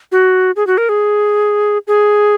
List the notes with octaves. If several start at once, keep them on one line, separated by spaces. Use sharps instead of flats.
F#4
G#4
F#4
A#4
G#4
G#4